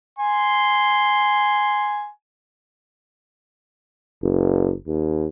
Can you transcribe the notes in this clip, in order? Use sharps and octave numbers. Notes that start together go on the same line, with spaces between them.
G#5 C6
F#1
D#2